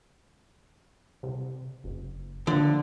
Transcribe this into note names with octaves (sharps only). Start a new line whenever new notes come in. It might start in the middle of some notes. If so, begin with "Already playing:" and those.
C2
F#1
D3 F3